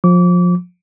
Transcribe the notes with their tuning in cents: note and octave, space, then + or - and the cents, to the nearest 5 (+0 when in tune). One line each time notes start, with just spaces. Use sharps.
F3 +25 D6 -30